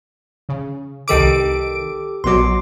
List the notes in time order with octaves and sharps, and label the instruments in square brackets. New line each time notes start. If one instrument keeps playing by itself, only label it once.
[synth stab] C#3
[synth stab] C2 D#3 D7 [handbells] G4 A4 D6
[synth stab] A#1 B2 F#3 [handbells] C6 D6